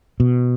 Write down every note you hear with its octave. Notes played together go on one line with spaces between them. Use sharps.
B2